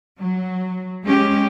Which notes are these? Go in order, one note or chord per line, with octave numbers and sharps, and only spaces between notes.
F#3
G#3 C#4 G4